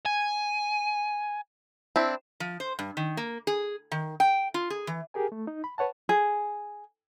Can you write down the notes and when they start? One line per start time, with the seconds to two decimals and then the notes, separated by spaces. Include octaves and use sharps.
0.06 G#5
1.96 C4 D4 E4
2.40 F3
2.60 C5
2.79 G2
2.97 D#3
3.17 A#3
3.47 G#4
3.92 D#3
4.20 G5
4.54 F4
4.70 G#4
4.87 E3
5.14 G4 G#4 A#4 G#5
5.32 A3
5.47 D#4
5.64 B5
5.78 B4 C#5 F#5 A5
6.09 G#4